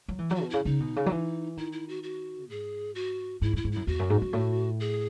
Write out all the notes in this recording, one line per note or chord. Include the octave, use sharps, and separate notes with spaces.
F#3
E3
F#3 E4 F#4
B2
C#3 E4
C#3 D#4
B2
C#3
F#3
E3
D#3 E4
E4
F#4
F#4
G#2 G#4
F#4
G#2 E4
F#2 E4
G#2
F#2 E4
E2 F#4
F#2
G#2
F#2
A2
G#4